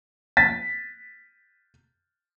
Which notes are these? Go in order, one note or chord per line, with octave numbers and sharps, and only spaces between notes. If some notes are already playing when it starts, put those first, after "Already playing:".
A6 B6